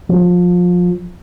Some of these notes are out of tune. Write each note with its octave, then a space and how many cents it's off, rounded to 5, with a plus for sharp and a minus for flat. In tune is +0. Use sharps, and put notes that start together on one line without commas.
F3 +25